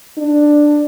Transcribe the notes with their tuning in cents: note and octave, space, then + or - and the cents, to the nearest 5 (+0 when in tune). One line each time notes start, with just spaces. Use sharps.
D4 +10